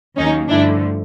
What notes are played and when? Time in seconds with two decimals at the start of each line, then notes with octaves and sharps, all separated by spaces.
0.16 D#2 D#3 F#3 A#3 C#4 D#4
0.49 G2 D3 F3 A3 D4 E4